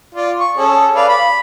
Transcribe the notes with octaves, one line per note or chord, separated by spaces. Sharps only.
F4 D5
C#6
C#4 G#4 A4
B4 D5 F5
B5